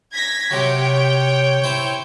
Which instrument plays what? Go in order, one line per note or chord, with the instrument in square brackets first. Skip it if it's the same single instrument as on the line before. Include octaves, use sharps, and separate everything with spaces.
[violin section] G#6 A#6 B6
[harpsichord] C3 F#3 [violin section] C#5 G5
[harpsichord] C4 E4 C5